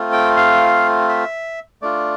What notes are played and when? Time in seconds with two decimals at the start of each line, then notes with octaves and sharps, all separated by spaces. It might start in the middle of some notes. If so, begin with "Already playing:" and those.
Already playing: A3 C4 F4
0.12 G5
0.37 F5
1.09 E5
1.82 A3 D4 F4 D5